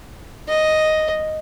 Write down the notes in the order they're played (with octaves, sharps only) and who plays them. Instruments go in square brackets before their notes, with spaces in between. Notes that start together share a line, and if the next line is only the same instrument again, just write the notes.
[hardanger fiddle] D#5